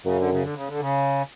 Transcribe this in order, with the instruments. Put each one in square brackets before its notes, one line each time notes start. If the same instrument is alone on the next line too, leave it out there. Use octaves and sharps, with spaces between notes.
[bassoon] F#2 [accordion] C#3
[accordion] D3
C#3
D3
C#3
D3
C#3